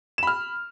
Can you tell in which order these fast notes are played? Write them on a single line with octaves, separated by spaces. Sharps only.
E7 B5 F6